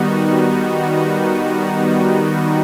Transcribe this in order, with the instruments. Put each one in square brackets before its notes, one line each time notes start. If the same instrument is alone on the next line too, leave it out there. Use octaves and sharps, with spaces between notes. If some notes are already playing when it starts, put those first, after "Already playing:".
Already playing: [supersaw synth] D#3 G3 B3 D#4 F#4